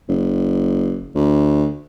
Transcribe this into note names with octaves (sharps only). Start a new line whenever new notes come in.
F#1
D2